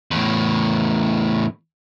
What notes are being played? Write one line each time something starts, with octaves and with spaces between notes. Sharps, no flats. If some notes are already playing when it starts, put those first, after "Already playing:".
E2 A2